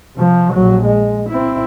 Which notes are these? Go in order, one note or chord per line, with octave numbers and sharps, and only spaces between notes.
C3 F3
A#1 F#3
G#3
C4 E4